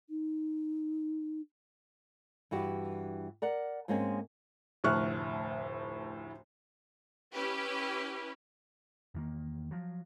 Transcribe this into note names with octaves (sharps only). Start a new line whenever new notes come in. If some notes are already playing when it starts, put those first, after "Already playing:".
D#4
G2 E3 F#4 G4
A#4 D5 F#5
G#2 G#3 A#3 C4 C#4 G#4
F1 D2 A2 C#6 F6 F#6
C#4 E4 G4 B4
E2 D#3 A#3
F3 F#3